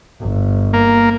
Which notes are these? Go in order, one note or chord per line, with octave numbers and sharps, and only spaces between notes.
G1
A#3